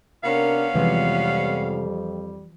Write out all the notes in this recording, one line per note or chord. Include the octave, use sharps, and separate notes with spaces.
C3 B3 C#4 D4 A#4 F5
F2 C3 E3 F3 G3 G#3